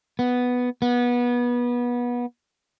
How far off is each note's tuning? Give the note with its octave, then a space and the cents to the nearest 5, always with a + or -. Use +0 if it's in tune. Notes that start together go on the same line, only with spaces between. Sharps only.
B3 +0
B3 -25